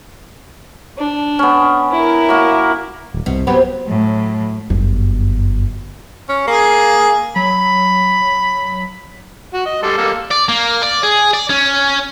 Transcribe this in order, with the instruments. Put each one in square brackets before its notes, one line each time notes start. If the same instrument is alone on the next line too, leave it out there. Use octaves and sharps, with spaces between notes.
[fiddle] D4
[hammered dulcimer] B3 C#4
[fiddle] E4 A#4
[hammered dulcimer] F#3 A#3
[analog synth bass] D#1
[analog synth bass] C2 [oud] B2
[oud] F#3 C4 G4 [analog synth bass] B3
[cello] A2 F#3
[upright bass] G1 F#2
[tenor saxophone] C#4
[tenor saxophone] A#3 [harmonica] G#4
[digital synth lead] F#3 [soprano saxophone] B5
[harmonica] F#4
D#5
G3 A4 C6
G3 A#3 A4
[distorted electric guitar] D5
A#3
D5
G#4
D5
C#4